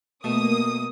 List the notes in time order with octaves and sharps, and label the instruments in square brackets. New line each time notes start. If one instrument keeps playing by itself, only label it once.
[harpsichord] B2 [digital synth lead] A3 [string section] A#3 D#6